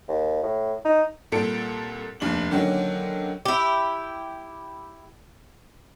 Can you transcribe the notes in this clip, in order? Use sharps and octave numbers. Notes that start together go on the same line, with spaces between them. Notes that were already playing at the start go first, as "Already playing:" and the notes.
D#2
A2
D#4
C2 A#2 A4 C#7 D7
F1 D#2 D4 F#7
D3 D#3 F#3 A#3 C#4
E4 G4